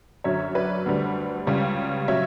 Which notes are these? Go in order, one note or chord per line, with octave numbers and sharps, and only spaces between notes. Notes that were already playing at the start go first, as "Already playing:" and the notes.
F#2 D3 F#3 C#5 E5
B4 D5
D2 D3 G3
C#2 C#3 G3
C#3 F#3 C#5 E5